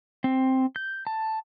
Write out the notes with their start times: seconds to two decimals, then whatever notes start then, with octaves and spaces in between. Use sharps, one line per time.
0.24 C4
0.76 G6
1.07 A5